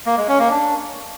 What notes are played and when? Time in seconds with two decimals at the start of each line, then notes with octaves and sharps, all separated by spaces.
0.06 A#3
0.17 G#3
0.28 C#4
0.39 A#3
0.50 D4